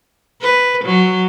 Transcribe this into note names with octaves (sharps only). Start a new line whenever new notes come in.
B4
F#3